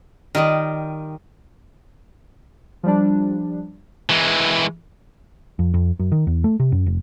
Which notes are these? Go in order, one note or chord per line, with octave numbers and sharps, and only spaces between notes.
D#3 G3 F4 G4 D#5
F3 G3 D4
E3 G#3
F2
F2
F#2
D#3
E2
A3
C3
F#2
F1